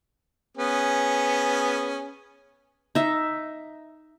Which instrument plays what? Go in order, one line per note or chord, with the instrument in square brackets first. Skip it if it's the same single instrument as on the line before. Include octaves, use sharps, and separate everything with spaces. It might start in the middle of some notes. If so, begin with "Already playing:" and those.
[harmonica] B3 C#4 G#4
[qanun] D#4 E5